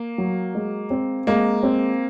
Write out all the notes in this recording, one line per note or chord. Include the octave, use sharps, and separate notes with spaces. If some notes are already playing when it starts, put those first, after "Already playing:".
Already playing: A#3
F#3
G#3
C4
G#3 A#3
C4